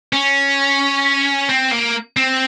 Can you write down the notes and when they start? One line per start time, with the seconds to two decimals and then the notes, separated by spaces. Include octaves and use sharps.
0.13 C#4
1.49 C4
1.72 A#3
2.17 C4